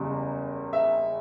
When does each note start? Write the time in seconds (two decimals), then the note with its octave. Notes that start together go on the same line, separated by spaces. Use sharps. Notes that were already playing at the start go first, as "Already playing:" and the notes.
Already playing: F#1 E2 C#3 G3
0.73 E5